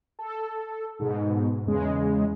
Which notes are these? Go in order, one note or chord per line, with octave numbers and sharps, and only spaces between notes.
A4
G#2 B2
E2 C#3 G#3